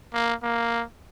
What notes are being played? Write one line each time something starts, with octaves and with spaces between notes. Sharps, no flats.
A#3
A#3